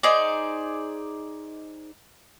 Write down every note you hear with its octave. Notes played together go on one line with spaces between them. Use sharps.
D#4 G#4 C5 D5